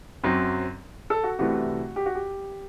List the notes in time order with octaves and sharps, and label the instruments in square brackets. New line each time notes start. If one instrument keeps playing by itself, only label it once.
[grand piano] F#2 F#3 C4 C5
A4
F#4
C2 C3 E3 A3 F#4
G4
F#4
G4